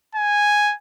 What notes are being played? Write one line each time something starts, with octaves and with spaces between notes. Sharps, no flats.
G#5